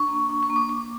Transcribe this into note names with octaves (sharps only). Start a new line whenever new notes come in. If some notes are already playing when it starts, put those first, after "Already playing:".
Already playing: D4 C#6
A#3
D4
C#6
A#3
D6
A#3 D6